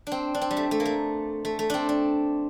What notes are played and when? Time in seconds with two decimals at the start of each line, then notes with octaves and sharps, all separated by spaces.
0.07 C4 D4
0.35 D4
0.41 C4
0.51 G3
0.57 A3
0.71 A3
0.80 A#3
0.85 A3
1.45 A3
1.59 A3
1.70 C4 D4
1.89 D4